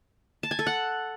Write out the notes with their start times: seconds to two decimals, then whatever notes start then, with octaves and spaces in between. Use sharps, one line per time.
0.43 A5
0.51 G#5
0.59 A4
0.67 F#5